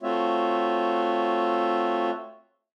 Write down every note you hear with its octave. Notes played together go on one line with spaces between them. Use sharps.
A3 C4 F4 F#4 C#5 E5